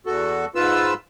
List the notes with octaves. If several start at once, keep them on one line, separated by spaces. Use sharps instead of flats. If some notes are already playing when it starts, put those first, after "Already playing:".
E2 F#4 A4
G#2 F4 B4 E6